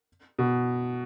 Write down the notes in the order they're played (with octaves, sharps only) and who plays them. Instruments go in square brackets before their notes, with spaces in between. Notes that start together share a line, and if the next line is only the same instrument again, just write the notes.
[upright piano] B2